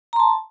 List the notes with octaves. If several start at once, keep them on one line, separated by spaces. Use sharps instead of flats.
A5 A#5 C6